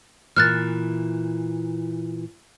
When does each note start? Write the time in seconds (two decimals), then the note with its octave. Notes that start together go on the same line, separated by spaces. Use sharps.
0.36 A#2 E3 F6 F#6 A6